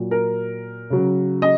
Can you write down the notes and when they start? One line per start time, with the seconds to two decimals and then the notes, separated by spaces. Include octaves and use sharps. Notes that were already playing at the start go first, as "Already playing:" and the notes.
Already playing: A#2 F#3
0.11 A#4
0.90 C#3 F#3
1.42 D#5